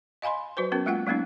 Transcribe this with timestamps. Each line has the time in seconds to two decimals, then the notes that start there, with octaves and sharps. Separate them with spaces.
0.22 D#5 F5 G#5 B5 C6
0.57 F#3 F#4 B4 C5
0.72 B3 C#4 F#4 A#4
0.86 G#3 A#3 F4 F#5 G5
1.06 F#3 G#3 A#3 B3 C#4 D#4